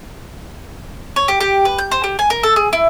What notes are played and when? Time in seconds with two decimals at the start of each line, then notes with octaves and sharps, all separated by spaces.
1.16 C#5
1.28 G4
1.40 G4
1.65 B4
1.79 G6
1.92 C5
2.04 G4
2.19 G#5
2.30 A#4
2.43 A4
2.56 G#4
2.73 E4